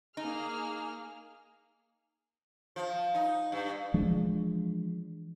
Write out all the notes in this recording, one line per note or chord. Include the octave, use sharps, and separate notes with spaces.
A#3 D#4 G#4 F6
F3
D#4
G2
E3 F3 G#3 D4